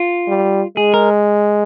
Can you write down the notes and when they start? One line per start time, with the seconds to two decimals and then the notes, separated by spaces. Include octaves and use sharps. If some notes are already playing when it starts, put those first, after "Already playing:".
Already playing: F4
0.28 G3
0.77 G#3 G#4
0.94 A#4